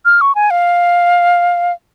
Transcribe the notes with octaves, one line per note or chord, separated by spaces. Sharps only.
F6
C#6
G#5
F5